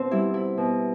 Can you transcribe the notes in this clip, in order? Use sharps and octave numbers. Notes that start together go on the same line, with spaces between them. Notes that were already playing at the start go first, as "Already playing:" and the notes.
Already playing: B2 C4
G3 E4
E4
B2